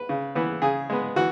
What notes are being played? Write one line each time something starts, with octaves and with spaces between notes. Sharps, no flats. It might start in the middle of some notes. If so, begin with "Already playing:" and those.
Already playing: B4
C#3
E3 B3
C#3 G#4
G#3 B3
E3 F#4